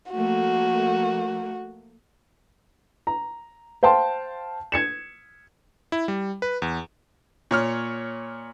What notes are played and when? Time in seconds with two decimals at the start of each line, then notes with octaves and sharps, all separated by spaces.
0.11 F3 A3 A#3 F#4
3.07 A#5
3.83 C5 F5 G5 A5 C6
4.72 G#6 C#7 E7
5.92 E4
6.08 G3
6.42 B4
6.62 E2
7.51 A#2 C#5 F6